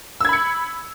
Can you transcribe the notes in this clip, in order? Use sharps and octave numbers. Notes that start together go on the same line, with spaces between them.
B5 E6 G#6 C#7